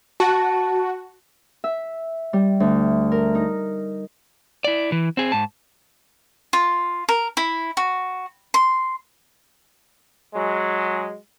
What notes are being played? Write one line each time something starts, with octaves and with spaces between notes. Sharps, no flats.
F#4 A5
E5
G3
D2
A#4
D#4
E4 D5
E3
C4 G#4
G#2 A5
F4
A#4
E4
F#4
C6
F#3 G#3